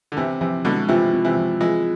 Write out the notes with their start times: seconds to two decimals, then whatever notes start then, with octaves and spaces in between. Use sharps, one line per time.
0.12 D3
0.17 C3 E3 C4
0.41 C3 E3 F3
0.65 B2 D3 G#3
0.89 C3 E3 F4
1.13 C4
1.25 C3 E3
1.37 F3
1.61 E3 G#3 F4